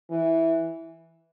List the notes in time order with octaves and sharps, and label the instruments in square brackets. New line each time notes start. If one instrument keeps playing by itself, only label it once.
[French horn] E3